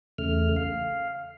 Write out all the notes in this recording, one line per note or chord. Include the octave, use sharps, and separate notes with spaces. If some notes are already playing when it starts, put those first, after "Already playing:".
E2 C#3 A3 F6
F5